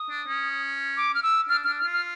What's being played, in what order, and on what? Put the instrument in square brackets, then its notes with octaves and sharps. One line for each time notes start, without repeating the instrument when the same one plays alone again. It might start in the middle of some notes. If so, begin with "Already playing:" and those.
Already playing: [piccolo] D#6
[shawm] D4
C#4
[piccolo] D6
F6
E6
[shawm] D4 [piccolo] F6
[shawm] D4 [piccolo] F6
[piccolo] F6
[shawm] F4
[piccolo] F6